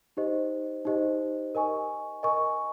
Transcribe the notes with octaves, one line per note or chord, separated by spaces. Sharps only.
D#4 G4 C5 D#5
D#4 G4 C5 D#5
A#4 D#5 G#5 C#6
A#4 D#5 G#5 C#6